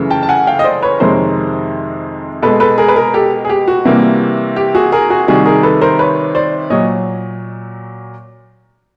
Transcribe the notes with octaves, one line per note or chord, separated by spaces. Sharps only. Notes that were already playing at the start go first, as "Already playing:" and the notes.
Already playing: F#2 C#3 E3 A3
G5 A5
A5
F#5 G#5
F5 G5
D#5
C5 D5
B4 C#5
F2 C3 D#3 G#3 A#4 C5
B2 G#3 A4 B4
A4 B4
G#4 A#4
B4
G#4 A#4
G4 A4
G#4
G4
F#4
C3 E3 G3 A#3
G4
F#4 G#4
G#4 A#4
F#4 G#4
C3 D#3 G3 F#4 G#4
G#4 A#4
A4 B4
A#4 C5
B4 C#5
C5 D5
A#2 F#3 C#5 D#5